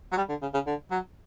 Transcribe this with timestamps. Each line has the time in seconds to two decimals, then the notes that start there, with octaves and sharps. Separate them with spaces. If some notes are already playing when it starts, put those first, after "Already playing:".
0.12 F#3
0.17 G3
0.29 D3
0.42 C#3
0.54 C#3
0.67 D3
0.91 F#3